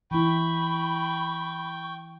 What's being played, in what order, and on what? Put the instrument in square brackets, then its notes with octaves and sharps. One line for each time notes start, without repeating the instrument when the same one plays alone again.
[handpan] E3 E4 [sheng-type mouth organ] G5 [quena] B5 [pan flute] C#6